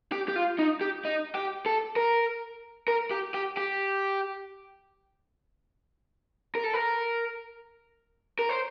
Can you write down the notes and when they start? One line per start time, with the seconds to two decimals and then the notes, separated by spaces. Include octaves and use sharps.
0.12 G4
0.28 G4
0.36 F4
0.59 D#4
0.81 G4
1.05 D#4
1.35 G4
1.66 A4
1.96 A#4
2.88 A#4
3.11 G4
3.34 G4
3.57 G4
6.55 A#4
6.64 A4
6.73 A#4
8.39 A#4
8.49 C5